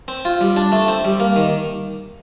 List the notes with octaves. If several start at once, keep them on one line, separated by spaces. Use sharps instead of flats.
C4
F4
G3
D4
A3
C4
G3
A#3
D#3